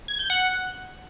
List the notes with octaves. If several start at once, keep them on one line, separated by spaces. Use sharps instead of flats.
G#6
G6
F#5